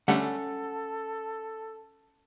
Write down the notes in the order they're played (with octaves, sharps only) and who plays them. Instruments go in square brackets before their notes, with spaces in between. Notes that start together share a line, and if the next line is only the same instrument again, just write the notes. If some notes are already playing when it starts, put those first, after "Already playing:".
[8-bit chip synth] D3 G3 A3 [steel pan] C#4 [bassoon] A4 [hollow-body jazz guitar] F#5